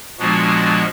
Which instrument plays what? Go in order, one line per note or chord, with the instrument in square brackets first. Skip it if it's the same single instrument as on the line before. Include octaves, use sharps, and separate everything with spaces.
[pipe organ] A#2 F3 G#3 B3 D4 F#4